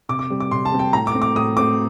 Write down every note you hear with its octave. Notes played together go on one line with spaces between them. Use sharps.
C3 D6
D6
G3 C4
D6
C3 C6
A5
G3 C4
G5
A2 A#5
D6
A3 C4
D6
A2 D#6
A3 C4 D6